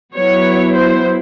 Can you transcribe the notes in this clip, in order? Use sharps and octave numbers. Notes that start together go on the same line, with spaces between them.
F#3 B3 E4 C#5
C5